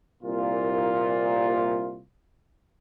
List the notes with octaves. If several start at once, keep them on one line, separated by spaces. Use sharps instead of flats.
C2 A#2 F4